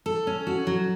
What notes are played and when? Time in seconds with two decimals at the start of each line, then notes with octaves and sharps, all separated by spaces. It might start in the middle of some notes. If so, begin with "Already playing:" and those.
0.06 A4
0.27 C#4
0.47 F#4
0.67 F#3